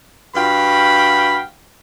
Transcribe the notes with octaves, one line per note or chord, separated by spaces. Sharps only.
G2 F#4 F5 G5 B5